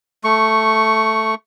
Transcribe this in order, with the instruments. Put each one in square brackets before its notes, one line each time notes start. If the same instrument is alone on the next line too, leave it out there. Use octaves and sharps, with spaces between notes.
[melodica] A3 C#6